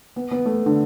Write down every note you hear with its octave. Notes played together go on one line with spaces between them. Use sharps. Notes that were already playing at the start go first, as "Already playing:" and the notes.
B3
B3
A3
D3